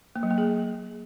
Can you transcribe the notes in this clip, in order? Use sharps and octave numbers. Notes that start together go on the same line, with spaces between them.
A#3
F#3
A#3
G#4